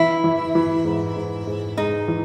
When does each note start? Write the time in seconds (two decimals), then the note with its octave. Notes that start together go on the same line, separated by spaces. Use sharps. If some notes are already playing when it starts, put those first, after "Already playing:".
Already playing: E3 E4
0.24 E3
0.55 E3
0.85 G#2
1.16 G#2
1.47 G#2
1.77 G#3 D#4
2.08 E3